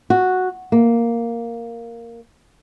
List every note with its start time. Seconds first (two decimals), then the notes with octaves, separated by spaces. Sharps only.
0.10 F#4
0.72 A#3